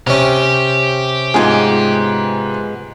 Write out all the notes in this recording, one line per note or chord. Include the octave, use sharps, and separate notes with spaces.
C3 C#4 G4
G#2 G#3 B3 F4 G#4